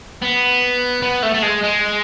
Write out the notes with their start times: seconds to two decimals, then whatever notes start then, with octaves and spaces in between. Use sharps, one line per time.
0.22 B3
1.02 B3
1.23 A3
1.34 A3
1.42 G#3
1.64 G#3